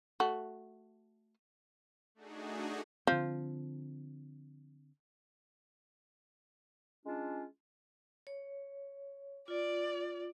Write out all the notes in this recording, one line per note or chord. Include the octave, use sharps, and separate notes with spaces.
A3 F#4
A3 D4 D#4 F#4 G#4
D3 F3 C4
G#3 C#4 D4 F4
C#5
F4 D5